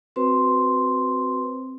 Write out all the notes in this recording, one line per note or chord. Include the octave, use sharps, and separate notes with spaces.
C4 F#4 B4 C5 C6